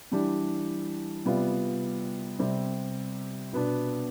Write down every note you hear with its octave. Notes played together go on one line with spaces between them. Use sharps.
E3 G3 D4 G4
C3 G3 B3 F4
C3 G3 C4
B2 B3 D4